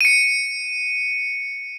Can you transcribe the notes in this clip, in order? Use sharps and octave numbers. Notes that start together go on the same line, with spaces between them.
C#7 D#7